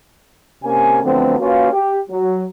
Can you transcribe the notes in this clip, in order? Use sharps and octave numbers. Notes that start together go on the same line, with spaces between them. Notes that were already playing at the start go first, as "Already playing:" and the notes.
C3 A#3 C#4 G#5
D3 F3 F#3 A3 B3 C4
A#3 C#4 F4 F#4 B4 F5
G4
F#3